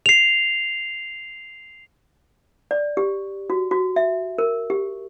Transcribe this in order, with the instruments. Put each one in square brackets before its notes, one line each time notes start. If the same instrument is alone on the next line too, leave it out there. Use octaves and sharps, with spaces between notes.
[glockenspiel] C7 F7
[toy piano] D5
G4
F#4
F#4
E5
A#4
G4